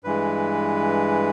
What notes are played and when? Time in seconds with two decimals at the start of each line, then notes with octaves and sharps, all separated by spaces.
0.04 G2 E3 G#3 B4